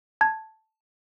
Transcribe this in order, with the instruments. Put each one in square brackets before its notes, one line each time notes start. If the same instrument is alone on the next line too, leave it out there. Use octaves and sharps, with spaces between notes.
[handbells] A5 G#6